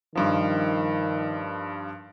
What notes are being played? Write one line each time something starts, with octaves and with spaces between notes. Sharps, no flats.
G2 D#3 F3